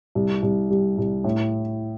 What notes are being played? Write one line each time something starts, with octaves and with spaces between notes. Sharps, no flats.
C2
C2
G3
C2
A2